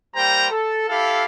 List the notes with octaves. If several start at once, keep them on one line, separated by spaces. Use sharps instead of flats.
G3 A#3 C5 G5 A#5
A4
E4 G4 A4 F5